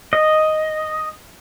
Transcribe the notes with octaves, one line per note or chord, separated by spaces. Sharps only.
D#5